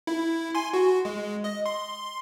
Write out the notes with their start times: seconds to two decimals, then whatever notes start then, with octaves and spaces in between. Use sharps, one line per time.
0.07 E4
0.55 G#5 C6
0.74 F#4
1.05 G#3
1.44 D#5
1.66 C6